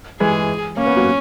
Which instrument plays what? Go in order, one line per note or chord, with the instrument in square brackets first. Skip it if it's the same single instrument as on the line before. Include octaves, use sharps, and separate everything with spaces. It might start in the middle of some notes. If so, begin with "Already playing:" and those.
[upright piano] E3 G#3 [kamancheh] G#4
[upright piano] A#3 [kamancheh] C#4
[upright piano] B3
F#3 A#3